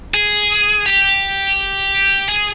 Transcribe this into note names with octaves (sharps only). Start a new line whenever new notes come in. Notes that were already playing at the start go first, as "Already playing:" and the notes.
G#4
G4
G#4